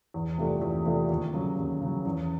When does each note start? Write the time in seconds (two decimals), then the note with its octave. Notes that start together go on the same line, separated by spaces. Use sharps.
0.14 E2
0.38 C3 F3 A3 D4
0.62 E2
0.86 C3 F3 A3 D4
1.10 D#2
1.34 C#3 F#3
1.58 D#2
1.81 C#3 F#3
2.05 E2